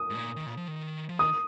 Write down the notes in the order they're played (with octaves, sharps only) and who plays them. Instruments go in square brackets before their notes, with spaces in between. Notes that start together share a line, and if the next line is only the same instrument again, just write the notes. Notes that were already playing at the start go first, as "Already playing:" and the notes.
Already playing: [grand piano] D#6
[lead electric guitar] G#2
A#2
D#3
A#2
F3
D#3
F3
[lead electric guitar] D#3 [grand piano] D#6